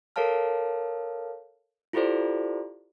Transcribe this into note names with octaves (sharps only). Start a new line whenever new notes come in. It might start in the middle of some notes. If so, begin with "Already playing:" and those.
A4 A#4 C#5 F5 A5 F6
E4 F4 G4 A4 C5 D5